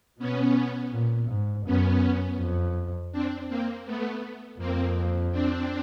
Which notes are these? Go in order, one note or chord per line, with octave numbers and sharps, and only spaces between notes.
B2 B3 C#4
A#2
G#2
F#2 B3 C#4
F2
C4 D4
A#3 C4
A3 B3
F2 A#3 C4
C4 D4